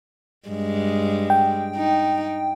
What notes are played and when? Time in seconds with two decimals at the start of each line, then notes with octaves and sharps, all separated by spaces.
0.48 G2 G#3
1.30 G5
1.76 D#4